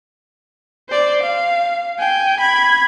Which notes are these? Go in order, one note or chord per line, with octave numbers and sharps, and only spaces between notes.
C5 D5
F5
G5 G#5
B5 G#6